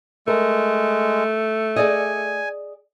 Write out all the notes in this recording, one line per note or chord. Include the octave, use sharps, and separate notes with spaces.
G#3 A3 A#4
G#4 D5 D#5 G#5